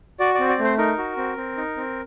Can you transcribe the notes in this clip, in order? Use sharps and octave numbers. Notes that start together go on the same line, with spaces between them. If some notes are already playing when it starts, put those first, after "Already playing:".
F#4 D5
C4 D5
D5
A3 C5
D#4 A#4
F#4
C4
C4
D#4
C4